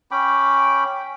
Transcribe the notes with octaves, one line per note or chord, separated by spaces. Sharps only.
C#4 G5 B5 D6